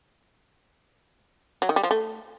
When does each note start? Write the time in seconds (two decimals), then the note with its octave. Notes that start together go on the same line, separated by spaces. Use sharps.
1.62 F#3
1.69 D#3
1.76 G3
1.83 F3
1.91 A3